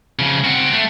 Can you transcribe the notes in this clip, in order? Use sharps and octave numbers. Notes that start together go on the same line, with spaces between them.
C#3 F3
C4 F#4
A3